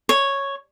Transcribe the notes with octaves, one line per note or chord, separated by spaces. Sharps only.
C#5